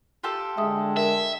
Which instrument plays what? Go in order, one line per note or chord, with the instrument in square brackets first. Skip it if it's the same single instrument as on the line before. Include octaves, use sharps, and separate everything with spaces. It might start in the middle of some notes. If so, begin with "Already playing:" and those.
[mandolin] F4 G4 A4
[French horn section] D3 G#3 [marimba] E5 D#6
[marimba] A#4 [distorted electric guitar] E5